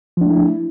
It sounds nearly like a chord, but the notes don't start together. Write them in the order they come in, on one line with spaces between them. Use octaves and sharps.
F3 D4 A3 E4